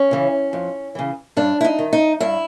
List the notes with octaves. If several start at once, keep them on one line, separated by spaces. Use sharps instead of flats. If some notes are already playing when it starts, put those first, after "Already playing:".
Already playing: C#4
C#3 E3
F2
C#3 E3
G2 D4
E4
D#4
D#3
D#4
G2 E4